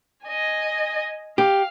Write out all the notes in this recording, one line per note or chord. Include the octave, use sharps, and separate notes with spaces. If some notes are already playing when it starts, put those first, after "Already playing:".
D#5 G#5
G4 F5